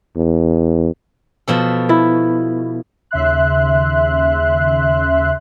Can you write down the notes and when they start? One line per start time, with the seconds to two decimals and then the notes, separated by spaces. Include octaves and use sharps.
0.17 E2
1.48 B2 F3 A4
1.89 E4
3.11 D#2 C#3 E5 C6 F#6